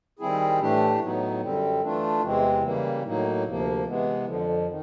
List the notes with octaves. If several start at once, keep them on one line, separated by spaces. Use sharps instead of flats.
D#3 G3 C4 E4 G#4
A2 E3 A3 D4 G4
A2 F#3 B3 D#4
F#2 D3 G3 C4
E3 A3 D4 F4
E2 C3 E3 G#3 C4
C#3 E3 G3 A#3
A2 F#3 A#3 D#4
D2 C3 F3 A#3
C3 E3 G#3 B3
F2 D3 F3
D#3